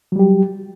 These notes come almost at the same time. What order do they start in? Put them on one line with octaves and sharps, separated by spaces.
F#3 G3 G4